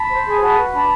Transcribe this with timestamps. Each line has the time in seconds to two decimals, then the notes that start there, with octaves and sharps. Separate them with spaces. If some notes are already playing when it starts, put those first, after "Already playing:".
Already playing: A5 B5
0.10 C5
0.26 G#4
0.41 F#4 A5 B5
0.57 B4
0.73 D4 A5 B5